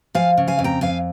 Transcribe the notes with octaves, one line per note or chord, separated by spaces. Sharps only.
F3 F5 G#5
C#3
F5 G#5
F2
G5 A#5
F2 F5 G#5